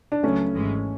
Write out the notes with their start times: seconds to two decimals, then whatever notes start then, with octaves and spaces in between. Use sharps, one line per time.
0.12 D4
0.23 C#2 C#3 F#3 A3 B3 C#4
0.55 G#1 G#2 E3 G#3